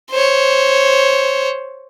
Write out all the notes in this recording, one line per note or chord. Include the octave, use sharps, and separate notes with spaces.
C5 C#5